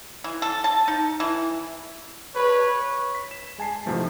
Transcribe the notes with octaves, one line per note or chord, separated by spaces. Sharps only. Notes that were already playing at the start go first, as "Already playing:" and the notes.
E3
A4
A5
D#4
E3
B4 C#5
B6
E7
G#3 G#5 A5 C7
E2 G#2 C3 F3 A3